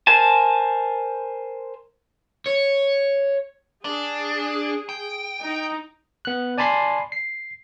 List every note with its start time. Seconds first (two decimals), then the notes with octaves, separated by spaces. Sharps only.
0.07 A#4 C5 G#5 A5
2.46 C#5
3.85 D4 G#4
4.89 G5
5.41 D#4
6.25 B3 F#6
6.58 D5 G#5 A5 B5 C6 C7
7.12 C7